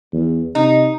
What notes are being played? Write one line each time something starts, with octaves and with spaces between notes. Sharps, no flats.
E2
C3 D#4